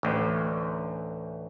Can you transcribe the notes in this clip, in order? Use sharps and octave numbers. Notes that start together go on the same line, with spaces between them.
A1 D2